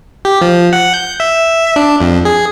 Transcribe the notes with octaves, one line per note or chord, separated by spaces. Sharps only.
G4
F3
F#5
G6
E5
D4
F2
G#4